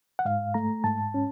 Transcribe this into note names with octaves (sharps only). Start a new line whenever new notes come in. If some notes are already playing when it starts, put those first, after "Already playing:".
F#5
G#2 F5
A3 A#5
G#2 A5
C#4